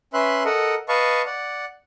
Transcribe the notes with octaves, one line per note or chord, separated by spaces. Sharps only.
C#4 B4 E5 C6 F#6
A4 A#4 D#5 F#5
B4 D#5 F5 A5 C#6
D5 F#5